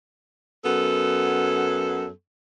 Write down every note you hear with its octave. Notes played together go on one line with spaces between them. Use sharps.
F#2 B3 A4